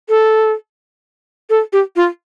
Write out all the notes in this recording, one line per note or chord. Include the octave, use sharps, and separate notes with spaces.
A4
A4
G4
F4